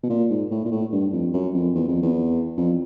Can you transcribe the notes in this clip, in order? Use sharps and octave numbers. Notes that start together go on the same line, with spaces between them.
B2
A#2
G#2
A2
A#2
A2
G2
F2
F#2
F2
E2
F2
E2
F2